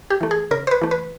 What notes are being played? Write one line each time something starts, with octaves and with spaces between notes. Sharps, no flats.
G4
E3 A3
G#4
C#3 A#4
C5
B4
E3 A3
B4